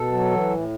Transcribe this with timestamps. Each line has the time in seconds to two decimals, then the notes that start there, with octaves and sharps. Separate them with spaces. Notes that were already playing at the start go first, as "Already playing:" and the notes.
Already playing: B2 A4
0.12 F#3
0.31 E3
0.50 A2